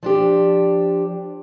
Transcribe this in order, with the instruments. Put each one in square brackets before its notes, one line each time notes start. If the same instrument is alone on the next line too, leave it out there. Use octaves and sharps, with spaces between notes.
[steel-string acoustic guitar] F3 D4 G4